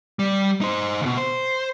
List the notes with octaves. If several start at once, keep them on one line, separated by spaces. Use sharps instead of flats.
G3
D#4 C5
D2 B2
C5